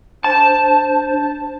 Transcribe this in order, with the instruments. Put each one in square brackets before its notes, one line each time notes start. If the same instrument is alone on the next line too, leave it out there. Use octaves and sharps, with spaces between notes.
[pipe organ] D4 C5 [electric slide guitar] A5